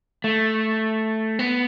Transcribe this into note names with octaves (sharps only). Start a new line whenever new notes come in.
A3
B3